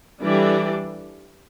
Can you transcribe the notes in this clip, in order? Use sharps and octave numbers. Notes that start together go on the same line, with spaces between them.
E3 G3 D4 A4 D5